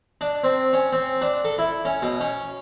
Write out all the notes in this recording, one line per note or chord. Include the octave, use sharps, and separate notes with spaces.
D4
C4
C#4
C4
D4
A4
E4
C#4
B2
C#4